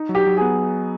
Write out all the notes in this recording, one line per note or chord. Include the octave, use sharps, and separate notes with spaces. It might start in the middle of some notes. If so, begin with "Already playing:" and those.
Already playing: D#4
F#3
G4
F#3
B3 G#4